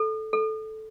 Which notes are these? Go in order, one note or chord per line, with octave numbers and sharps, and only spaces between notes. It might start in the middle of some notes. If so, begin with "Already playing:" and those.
Already playing: A4
A4